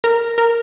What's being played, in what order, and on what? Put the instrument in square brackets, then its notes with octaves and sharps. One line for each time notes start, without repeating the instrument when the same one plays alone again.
[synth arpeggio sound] A#4
A#4